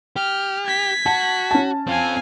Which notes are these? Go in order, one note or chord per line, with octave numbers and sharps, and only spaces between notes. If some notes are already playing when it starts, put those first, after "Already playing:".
G4 F6
G#6 B6
F#4 A5
C#4 A5
C4 F4 F5 G#5